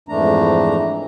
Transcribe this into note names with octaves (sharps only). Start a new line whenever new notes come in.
F2 G#2 E3 A3 D4 A#5